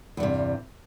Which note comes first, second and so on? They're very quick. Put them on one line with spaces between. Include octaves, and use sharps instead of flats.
E2 G2 C3